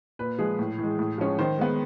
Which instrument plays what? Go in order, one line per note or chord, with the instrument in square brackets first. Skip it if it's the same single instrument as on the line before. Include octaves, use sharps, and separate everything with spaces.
[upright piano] A#2 B4
F3 G#3 G#4
A2
E3 G#3
A2
F3 G#3 C#4
D#3 C5
G#3 B3